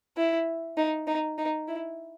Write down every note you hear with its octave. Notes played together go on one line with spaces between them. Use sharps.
E4
D#4
D#4
D#4
E4